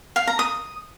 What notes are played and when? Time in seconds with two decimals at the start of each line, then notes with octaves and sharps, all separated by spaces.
0.16 F5
0.27 A#5
0.39 D#6